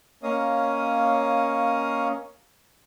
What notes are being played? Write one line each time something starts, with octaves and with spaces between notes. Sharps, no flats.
A#3 C#4 C#5 D#5 F5 D#6